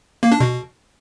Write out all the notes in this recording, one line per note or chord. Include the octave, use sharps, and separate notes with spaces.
A#3
D4
B2